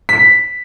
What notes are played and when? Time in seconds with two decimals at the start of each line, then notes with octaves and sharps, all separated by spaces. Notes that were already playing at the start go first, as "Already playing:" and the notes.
0.09 B6